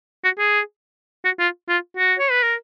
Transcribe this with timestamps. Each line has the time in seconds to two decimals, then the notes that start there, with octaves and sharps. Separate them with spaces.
0.24 F#4
0.39 G#4
1.25 F#4
1.39 F4
1.68 F4
1.97 F#4
2.20 C#5
2.31 B4
2.43 A#4